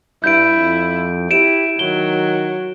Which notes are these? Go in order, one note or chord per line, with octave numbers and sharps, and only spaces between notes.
G2 E4 G6 D7
F2
E4 G4 D7 E7
D#3 F#3 G7